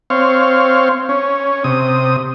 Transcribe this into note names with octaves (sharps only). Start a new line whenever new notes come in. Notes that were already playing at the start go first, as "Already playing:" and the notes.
C4 C#5 F5
C#4
C3 D#6